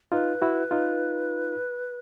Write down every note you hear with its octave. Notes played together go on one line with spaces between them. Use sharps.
D#4 F4 B4
E4 F#4
D#4 F4